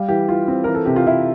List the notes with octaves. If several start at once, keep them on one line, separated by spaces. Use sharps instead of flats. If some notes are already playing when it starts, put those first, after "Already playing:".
Already playing: G3 F5
E3 G4
E3 F4
C4
E3 A#4
A4
C3 G4
F4
C3 E4